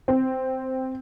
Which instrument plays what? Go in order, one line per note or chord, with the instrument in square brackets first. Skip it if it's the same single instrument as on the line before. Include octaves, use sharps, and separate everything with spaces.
[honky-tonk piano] C4